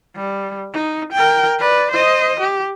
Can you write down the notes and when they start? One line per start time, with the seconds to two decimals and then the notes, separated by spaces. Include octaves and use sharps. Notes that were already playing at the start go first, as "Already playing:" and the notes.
0.16 G3
0.74 D#4
1.13 A#4 G5
1.59 B4 D5
1.91 C5 D#5
2.40 G4